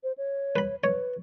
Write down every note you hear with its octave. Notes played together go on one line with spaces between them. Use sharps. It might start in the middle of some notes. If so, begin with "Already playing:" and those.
C5
C#5
B4 B5
B4 C#5